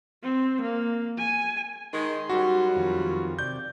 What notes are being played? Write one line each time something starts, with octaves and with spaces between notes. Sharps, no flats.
C4
A#3
G#5
D#3 G#3 D#4 C6
F#2 F#3 G3 F#4
F2 D#3 F4
C3 D5 G6